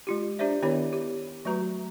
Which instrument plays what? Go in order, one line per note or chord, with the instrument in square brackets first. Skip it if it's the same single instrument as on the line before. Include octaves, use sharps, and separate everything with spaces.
[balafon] G#3 F4 G4
D4 G4 C5 D5 E5
D#3 B3 E4 G4 C#5 B5
G4
F#3 A3 F#4 B4 A#5